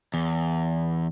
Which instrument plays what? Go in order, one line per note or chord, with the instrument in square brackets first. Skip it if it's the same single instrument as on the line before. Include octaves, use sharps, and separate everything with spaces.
[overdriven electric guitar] E2